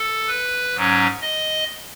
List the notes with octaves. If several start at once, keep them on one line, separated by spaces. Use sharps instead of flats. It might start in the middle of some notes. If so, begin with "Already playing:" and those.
Already playing: A4
B4
G#2 F#3 C#4
D#5